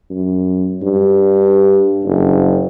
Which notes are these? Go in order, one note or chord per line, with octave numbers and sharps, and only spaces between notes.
F#2
G2
F#1